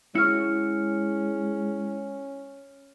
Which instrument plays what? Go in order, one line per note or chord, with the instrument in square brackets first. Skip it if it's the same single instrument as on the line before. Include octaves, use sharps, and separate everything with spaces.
[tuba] G#3 [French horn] C#4 [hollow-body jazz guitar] E4 F#4 C#5 [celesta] F6 C#7